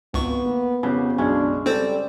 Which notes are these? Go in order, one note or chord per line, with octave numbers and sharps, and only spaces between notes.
G#1 C#2 B3 C#6
A#3
F2 C#3 B3 C#4 G4
B1 F#2 G#3 C#4 D4
G3 C4 A4 C5